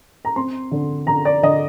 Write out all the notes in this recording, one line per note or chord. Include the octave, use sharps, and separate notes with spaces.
A#5
C4 C6
D3
D3 A#5
D5
D3 D#5